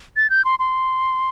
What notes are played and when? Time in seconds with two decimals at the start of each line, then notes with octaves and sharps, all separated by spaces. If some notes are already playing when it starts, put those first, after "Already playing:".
0.16 A6
0.30 G6
0.45 C6
0.59 C6